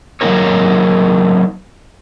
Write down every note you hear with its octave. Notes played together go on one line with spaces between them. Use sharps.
F#3 A#3 C4 D#4 A#4 C#5